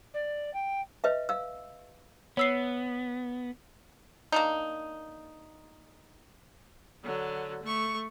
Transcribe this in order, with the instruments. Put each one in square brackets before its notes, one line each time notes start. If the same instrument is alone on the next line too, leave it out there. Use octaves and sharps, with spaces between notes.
[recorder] D5
G5
[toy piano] B4 D#5 E5
F5 E6
[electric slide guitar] B3 [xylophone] C#5 E6 C7
[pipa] A#3 D4 D#4
[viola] D3 F#3
A3 C#6